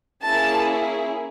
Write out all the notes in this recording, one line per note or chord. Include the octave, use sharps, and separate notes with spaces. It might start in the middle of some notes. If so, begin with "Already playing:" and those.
A#3 C#4 E4 G#4 A5